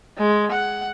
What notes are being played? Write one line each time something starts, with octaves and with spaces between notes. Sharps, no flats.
G#3
F#5